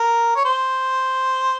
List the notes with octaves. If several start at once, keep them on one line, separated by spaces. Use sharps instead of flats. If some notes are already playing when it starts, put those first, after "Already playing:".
Already playing: A#4
C#5
C5